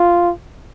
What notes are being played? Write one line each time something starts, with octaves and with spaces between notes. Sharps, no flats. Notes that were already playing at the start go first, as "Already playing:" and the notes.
Already playing: F4